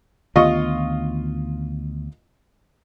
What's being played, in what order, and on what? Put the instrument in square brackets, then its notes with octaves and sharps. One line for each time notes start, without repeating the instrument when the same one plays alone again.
[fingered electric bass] D2 D#3 B3 [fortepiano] F4 D#5 C#6